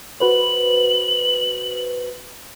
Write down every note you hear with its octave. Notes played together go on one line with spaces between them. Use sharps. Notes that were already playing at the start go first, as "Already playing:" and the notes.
F#4 B4 C5 F#7